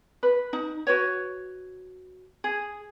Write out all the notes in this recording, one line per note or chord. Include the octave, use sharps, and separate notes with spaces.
B4
D#4
F#4 B4 C#5
G#4